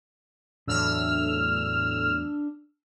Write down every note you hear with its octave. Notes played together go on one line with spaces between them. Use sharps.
E2 A2 F#3 D4 A5 E6 F6